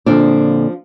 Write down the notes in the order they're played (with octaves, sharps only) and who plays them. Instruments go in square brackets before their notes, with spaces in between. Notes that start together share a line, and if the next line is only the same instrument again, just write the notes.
[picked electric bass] A#2 D3 [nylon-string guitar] F3 D4